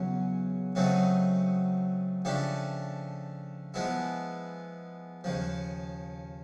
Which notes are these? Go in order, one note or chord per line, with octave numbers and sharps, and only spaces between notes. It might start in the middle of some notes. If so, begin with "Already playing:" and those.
Already playing: E2 C#3 F#3 C#4
C#3 F#3 A3 C4 D#4
C#3 F3 A3 D4 G4
F3 G#3 B3 E4
D#2 C#3 F3